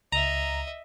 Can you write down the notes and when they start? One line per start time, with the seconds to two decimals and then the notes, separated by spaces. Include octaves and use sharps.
0.12 C#2 D#5 E5 A#5